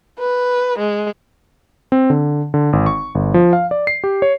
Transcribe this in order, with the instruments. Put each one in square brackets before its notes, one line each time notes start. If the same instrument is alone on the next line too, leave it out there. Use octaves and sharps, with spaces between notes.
[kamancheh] B4
G#3
[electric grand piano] C4
D3
D3
G#1
C#6
G1
F3
F5
D5
C7
G4
C#5